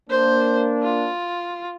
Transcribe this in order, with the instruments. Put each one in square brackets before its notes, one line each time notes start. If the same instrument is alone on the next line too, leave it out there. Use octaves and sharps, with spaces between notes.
[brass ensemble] A#3 D4 [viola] C5
[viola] F4